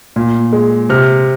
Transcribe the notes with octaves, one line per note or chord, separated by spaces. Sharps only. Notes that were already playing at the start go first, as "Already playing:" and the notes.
A#2
G#3
C3 F6